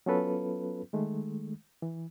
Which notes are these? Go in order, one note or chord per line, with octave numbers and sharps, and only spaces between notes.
F#3 B3 C#4 F4 A4 B4
D#3 G#3 A3
E3